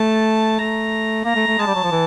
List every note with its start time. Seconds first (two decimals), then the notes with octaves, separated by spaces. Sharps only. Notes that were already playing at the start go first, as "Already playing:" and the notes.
Already playing: A3 A5
0.59 A3 A#5
1.25 A#3 A#5
1.36 A3
1.47 A3
1.58 G#3 A5
1.66 G3
1.75 F#3
1.84 F3
1.91 E3